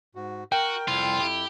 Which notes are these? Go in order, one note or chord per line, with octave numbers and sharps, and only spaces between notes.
G#2 F#4
F#4 A#4 G5
C2 F2 E4 F4
G4